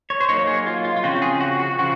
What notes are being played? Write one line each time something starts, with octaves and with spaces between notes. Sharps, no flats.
C#5
C5
F#3 A#3 D#4 C#5
G#4
F4
F4
F4
C#3 F3 C4 F#4
G#4
F#4
F#4
C#3 F3 F#4